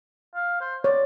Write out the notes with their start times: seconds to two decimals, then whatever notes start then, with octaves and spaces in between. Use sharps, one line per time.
0.35 F5
0.61 C5
0.84 C#5 D5